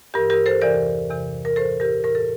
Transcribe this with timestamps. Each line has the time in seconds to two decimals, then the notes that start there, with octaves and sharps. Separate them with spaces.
0.14 G2 E3 G4 A#4
0.30 G4 A#4
0.46 A4 C5
0.61 E2 C3 E3 A#4 D5
1.09 E2 C3 E3
1.45 A#4
1.56 A2 E3 A4 C5
1.80 G4 A#4
2.04 A2 E3 A#4
2.15 A4